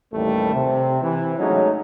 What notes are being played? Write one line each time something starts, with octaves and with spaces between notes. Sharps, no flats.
A1 D#2 G3 A3
C3
C3 E3
F#3 G#3 A3 C#4 D#4